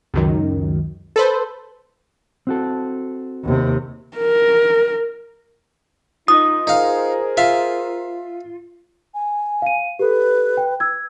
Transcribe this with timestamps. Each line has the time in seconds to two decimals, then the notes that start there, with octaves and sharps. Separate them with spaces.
0.14 C#2 F#2 D#3
1.16 A4 B4 C5
2.47 C4 F#4 A4
3.43 D#2 C3
4.17 A#4
6.28 D#4 F4 B4 D#5 D#6
6.67 D#4 G#4 A#4 C5 F5
7.37 F4 E5 F5
9.14 G#5
9.62 F5 D#7
9.99 G4 A4 B4
10.57 G5
10.80 E6 G#6